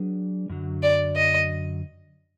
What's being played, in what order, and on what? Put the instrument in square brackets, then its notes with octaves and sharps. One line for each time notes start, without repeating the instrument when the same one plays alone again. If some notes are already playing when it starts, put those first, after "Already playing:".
Already playing: [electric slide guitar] F#3 D4 G#4 B4
F#2 D3 F#3
[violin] D5
D#5